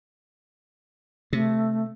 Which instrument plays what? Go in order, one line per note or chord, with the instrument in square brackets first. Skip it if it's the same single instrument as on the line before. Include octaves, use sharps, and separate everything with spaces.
[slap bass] C3 [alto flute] A3